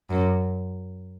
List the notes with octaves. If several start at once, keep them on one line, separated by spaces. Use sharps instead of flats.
F#2